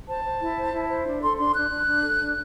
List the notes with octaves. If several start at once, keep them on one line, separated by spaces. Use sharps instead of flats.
C5 A5
C5
E4
C5
E4
C5
D4
A4 C6
D4 C6
D4 F#6
D4
D4
A4
D4